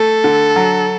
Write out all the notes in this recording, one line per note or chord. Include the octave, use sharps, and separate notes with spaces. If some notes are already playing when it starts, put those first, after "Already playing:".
Already playing: A3 A4
D3
F#3